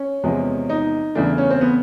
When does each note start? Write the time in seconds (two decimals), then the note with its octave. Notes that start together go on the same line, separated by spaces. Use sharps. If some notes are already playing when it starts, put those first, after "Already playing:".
Already playing: C#4
0.23 E2 C3 F3 G#3
0.69 D#4
1.15 E2 C#3 E3 A3 D4
1.38 C#4
1.50 C4
1.61 B3